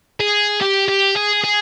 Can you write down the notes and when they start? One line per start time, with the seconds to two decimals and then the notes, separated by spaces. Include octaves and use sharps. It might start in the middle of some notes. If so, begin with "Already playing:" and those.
0.20 G#4
0.61 G4
0.89 G4
1.16 G#4
1.44 G#4